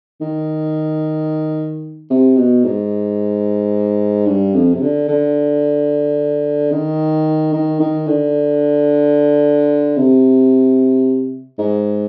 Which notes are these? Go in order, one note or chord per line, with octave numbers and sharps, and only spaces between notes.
D#3
C3
B2
G#2
G2
F2
C3
D3
D3
D#3
D#3
D#3
D3
C3
G#2